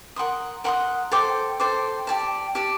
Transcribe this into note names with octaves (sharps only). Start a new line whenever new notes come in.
A#4 F#5 C6 D#6
A#4 F#5 C6 D#6
A4 C5 G5 D6
A4 C5 G5 D6
G4 D5 A5
G4 D5 A5